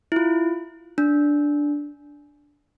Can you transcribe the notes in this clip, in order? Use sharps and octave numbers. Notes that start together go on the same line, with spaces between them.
E4
F4
D4